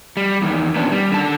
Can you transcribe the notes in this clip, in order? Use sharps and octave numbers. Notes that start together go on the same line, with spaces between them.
G3
E2 D#3
A#2 D#3 B3 C#4 D4
G3
D3 D#3 A5